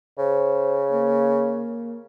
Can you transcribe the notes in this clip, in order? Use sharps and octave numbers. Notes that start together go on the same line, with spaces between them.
C#3 C5
A#3